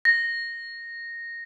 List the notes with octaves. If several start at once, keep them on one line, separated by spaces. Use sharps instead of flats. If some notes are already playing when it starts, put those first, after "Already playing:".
A#6